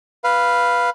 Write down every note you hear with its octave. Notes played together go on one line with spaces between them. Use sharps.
B4 F5